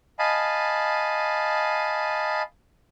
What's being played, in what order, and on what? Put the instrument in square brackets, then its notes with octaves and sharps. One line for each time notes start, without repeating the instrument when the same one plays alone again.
[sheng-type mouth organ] D#5 F5 G#5 A5 B5